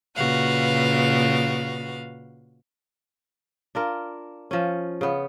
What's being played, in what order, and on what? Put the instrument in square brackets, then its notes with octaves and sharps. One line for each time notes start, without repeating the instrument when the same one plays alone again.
[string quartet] A#2 C#3 F#4 B4 F5
[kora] D4 F4 A#4
F3 C#4
C#3 B3